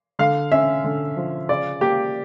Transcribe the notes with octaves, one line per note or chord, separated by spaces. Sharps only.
D3 F5
C#4 E5
D3
F3
C#3 D5
A#3 G4